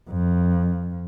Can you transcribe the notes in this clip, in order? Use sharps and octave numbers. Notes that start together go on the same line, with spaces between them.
F2